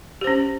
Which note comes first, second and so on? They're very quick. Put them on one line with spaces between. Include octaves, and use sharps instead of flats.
G4 C5 C#4